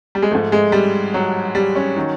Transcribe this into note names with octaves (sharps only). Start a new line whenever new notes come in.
G3
G#3
G#2 F3 A3
G#3
G3
F#3
G3
C#4
D#3 F#3